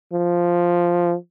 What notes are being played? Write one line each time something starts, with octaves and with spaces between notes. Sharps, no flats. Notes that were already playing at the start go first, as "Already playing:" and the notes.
F3